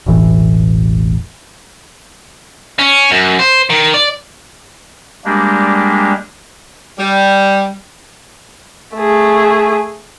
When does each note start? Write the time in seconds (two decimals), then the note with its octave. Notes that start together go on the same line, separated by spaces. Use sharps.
0.06 E1 A1 A2 E3
2.79 C#4
3.11 F#2
3.39 C5
3.70 D#3
3.94 D5
5.25 G3 G#3 A#3 D4 G4
6.98 G3
8.96 A3 G#4